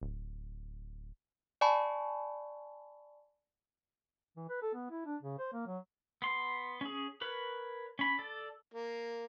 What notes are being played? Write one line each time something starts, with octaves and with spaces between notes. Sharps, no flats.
D1
D5 G#5 A5 B5 C#6
E3
B4
A4
B3
E4
D4
C#3
C5
A#3
F#3
B3 C6
C#4 G#4
A#4 B4 C#5
C#4 B5
A4 D5
A#3